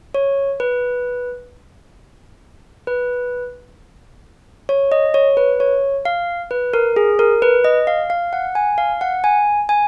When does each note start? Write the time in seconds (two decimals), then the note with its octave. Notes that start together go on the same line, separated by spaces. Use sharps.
0.14 C#5
0.60 B4
2.87 B4
4.69 C#5
4.92 D#5
5.14 C#5
5.37 B4
5.60 C#5
6.05 F5
6.51 B4
6.74 A#4
6.96 G#4
7.19 A#4
7.42 B4
7.65 D#5
7.87 F5
8.10 F5
8.33 F#5
8.55 G#5
8.78 F5
9.01 F#5
9.24 G#5
9.69 G#5